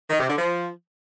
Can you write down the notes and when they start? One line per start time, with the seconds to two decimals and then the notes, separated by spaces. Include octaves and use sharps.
0.10 D#3
0.19 C3
0.29 D3
0.38 F3